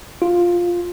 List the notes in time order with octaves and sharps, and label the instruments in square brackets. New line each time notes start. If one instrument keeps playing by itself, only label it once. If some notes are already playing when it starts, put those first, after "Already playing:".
[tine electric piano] F4